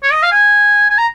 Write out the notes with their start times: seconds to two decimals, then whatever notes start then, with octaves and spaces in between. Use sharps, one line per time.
0.03 C#5
0.12 D#5
0.23 F5
0.32 G#5
0.90 G#5
0.98 A#5